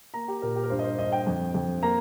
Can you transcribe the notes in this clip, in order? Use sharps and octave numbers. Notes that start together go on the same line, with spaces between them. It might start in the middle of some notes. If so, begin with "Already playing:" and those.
A#3 A#5
G4
A#2 A#4
G4
A#4
G2 C5
D#5
C5
G2 D#5
G5
F2
F2
A#3 A#5